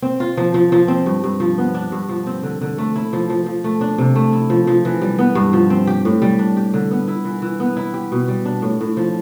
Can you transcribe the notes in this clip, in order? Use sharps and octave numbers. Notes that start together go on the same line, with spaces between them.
C4
F4
F3
F3
F3
C4
G2
G2
F3
B3
D4
G2
F3
C4
D3
D3
A3
E4
F3
F3
F3
A3
D4
C3
A3
E4
F3
F3
E3
G3
B3
G2
F3
C4
G4
A2
G3
D4
G4
D3
B3
E4
E3
E3
B3
E4
G4
B2
G3
D4
A2
A2
F3